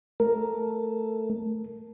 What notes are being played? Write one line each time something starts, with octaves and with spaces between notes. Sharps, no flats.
A3 A#4